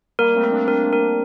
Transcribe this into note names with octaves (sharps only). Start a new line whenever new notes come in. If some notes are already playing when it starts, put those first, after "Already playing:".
G3 A#3 A#4
A3 C4
A#4
A#3 D4
A#3 D4 A#4
A#4